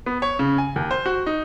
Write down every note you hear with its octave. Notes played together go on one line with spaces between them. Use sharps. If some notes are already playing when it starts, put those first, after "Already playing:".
B3
C#5
C#3
G#5
D#2
C5
F#4
D#4